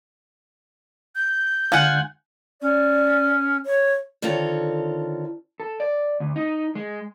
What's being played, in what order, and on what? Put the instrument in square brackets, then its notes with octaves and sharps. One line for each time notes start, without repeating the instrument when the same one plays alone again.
[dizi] G6
[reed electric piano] D3 G#3 D4 [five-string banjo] F4 [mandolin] F#5 G#5
[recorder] C#4 [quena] D5
[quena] C#5
[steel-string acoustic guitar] D3 D#3 C4 F4 A4 C#5
[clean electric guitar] A4
D5
D2
D#4
G#3